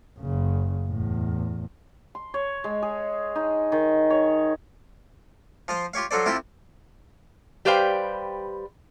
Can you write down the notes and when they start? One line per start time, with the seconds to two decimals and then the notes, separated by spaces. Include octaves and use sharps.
0.19 F#1 C#3
0.87 E2 A2
2.15 C6
2.34 C#5
2.64 G#3
2.82 G#4
3.35 D#4
3.72 D#3
4.10 C#5
5.68 F3 F4 C5
5.94 F4 G4 C#5 F5
6.11 F#3 F4 A4 C5 D5
6.26 C3 E4 F4 G4 G5 A5
7.65 G3 G4 B4 C5 F5 G5